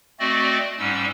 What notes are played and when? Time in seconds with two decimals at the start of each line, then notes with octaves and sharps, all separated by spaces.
0.19 A3 C4 F#4 D5 D#5
0.79 G#2 G3 C#4 E6